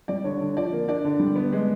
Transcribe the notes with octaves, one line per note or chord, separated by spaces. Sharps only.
G3 D5
D3 C#5
D3
F3 D5
A#3
D4 D5
D3
G3
B3
G#3